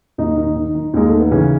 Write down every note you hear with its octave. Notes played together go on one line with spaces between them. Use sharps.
D#2 D#3 D#4
D#3
D#3
D#3
D#2 G#3
D#3 A3
B3
C#3 E3 C#4